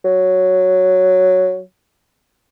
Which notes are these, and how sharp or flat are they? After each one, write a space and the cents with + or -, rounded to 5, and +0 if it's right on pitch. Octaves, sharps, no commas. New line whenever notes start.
F#3 +0